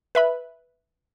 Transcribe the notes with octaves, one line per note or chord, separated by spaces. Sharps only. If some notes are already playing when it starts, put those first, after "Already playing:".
B4 E5 B5